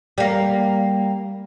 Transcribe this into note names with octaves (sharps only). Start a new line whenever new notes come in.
G3 A#3